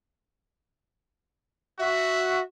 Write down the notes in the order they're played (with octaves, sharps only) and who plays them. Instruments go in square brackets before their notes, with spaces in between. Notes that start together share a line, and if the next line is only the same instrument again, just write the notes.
[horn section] F#4 [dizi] E5